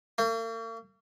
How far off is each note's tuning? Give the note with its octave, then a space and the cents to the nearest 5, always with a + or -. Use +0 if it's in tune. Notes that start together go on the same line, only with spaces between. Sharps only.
A#3 -45